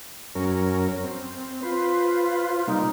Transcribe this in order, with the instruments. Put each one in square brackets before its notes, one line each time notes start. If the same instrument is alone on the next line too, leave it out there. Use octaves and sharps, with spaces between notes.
[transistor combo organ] F#2 C#4 A#4
C4
[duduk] F4 [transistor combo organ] B4 C5
[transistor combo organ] C3 G3 A#3 [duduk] D#4